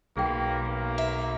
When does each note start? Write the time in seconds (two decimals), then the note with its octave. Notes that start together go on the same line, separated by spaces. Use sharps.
0.17 B1 A#3 G#4 G5
0.66 A#3
0.98 E5